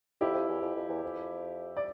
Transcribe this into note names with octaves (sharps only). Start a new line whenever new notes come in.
F2 E4 G4
F2
E2
F2
F2
E2
F2
D5